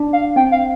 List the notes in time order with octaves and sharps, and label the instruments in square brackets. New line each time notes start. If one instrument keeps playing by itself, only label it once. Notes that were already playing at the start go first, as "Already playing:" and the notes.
Already playing: [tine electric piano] D4
[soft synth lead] F5
[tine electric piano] C4 [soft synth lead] G5
[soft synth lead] F5